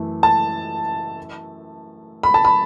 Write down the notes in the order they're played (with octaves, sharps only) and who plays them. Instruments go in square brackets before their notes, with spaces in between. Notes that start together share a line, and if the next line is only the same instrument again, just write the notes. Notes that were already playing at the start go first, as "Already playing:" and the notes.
Already playing: [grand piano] F#2 E3 A3
[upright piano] A5
B5
A5
B5